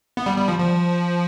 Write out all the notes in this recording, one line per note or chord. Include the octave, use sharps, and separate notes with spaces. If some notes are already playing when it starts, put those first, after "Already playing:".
B3
G3
G3
F3
F3